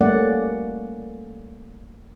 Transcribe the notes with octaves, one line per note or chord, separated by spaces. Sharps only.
G3 A3 A#3 C#4 D5 F#5